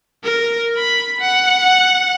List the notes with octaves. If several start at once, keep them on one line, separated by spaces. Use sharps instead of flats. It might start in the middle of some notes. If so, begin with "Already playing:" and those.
A#4
B5
F#5